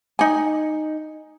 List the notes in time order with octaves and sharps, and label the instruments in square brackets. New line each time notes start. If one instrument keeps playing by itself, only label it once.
[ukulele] D#4 G#5